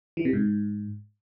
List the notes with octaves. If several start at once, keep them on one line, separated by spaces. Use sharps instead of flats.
E3
C3
G#2